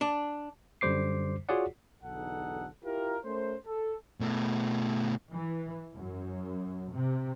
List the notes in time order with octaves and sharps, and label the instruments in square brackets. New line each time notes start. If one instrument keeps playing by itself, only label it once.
[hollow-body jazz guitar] D4
[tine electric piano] F#2 D3 G3 C5 D6 C7
F4 F#4 G#4 C#5 D5 F#5
[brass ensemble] B1 E2 D3 D#4 A4 F#5
E4 F4 G4 A#4
A3 C#4 A#4 C5
A4
[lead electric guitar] B2 A3
[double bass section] E3
F#2
C3